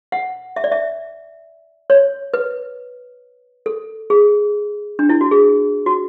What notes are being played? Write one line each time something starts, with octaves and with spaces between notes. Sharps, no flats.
F#5
E5
D5
E5
C#5
B4
A4
G#4
D4
E4
F#4
G#4
F#4